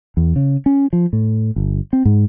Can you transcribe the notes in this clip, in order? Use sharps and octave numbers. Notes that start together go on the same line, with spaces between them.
E2
C#3
C#4
F3
A2
G1
C4
G#2